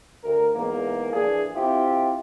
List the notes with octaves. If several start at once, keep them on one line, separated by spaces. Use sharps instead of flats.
D2 A#4
E2 G#2 A#3
A#1 E3 D4 G#4
C4 E4 F4 G4